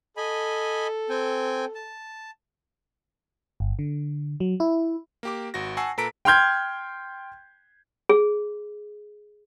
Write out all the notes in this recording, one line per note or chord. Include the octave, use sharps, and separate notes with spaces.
A4 D#5 G#5 B5
C4 G5 G#5
A5
G1
D3
F#3
E4
A#3 G4 D6
G#1 F#4 A#6
F#5 G#5 A5 C#6 E6 C7
A#2 A4 B4 A#5 B6 D7
G5 C6 F6 G6 G#6
G#4